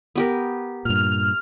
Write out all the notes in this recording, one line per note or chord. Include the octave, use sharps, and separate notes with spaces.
B3 G4 A#4
G2 A#2 F6